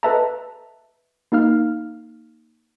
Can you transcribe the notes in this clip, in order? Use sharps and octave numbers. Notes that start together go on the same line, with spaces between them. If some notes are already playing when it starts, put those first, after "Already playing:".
A4 B4 D#5 E5 A5 A#5
A#3 D#4 F5 F6